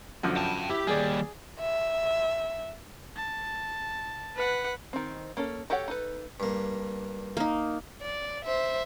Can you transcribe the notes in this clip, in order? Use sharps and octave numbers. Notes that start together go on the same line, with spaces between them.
F#2 D3 F3
G5 A5
E4 G4
D#2 G3 G#4 D5
E5
A5
B4 F#5
D#3 C4
A#3 C#4 A4
F#4 G4 A4 C#5 F#5
D#4 A4 B4
G2 A#3
A#3 D#4
D5
C5 E5